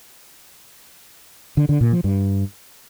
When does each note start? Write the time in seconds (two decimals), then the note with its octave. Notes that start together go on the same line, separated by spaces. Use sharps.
1.57 D3
1.69 D3
1.81 A#2
1.92 F3
2.04 G2